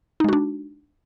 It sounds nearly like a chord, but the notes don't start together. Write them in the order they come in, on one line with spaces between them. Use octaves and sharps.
D#4 G#3 F#4 D4